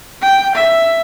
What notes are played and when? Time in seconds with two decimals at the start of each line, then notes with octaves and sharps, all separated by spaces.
0.22 G5
0.55 E5